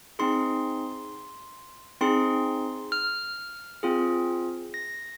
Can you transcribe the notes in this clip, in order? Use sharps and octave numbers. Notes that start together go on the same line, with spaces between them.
C4 D#4 G#4 C6
C4 D#4 G#4 C6
F6
C4 F4 G#4
A#6